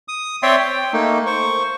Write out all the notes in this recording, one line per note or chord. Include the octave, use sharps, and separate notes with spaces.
D#6
C4 C#5 D5 E5 G5 C6
G5
A3 A#3 D#4
C5 C#6